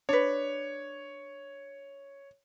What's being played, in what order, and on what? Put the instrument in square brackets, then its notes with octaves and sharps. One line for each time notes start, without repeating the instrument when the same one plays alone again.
[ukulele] D4 B4 [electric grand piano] C#5